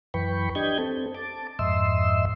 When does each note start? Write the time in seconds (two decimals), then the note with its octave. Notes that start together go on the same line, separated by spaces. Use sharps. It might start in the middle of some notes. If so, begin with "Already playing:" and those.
0.14 F#2 E3 B4 G5 B5 C#6
0.55 D4 G4 D#5 G6 G#6
0.78 C4 A4
1.15 A5 D6
1.59 F2 G#2 D#5 E5 C6 E6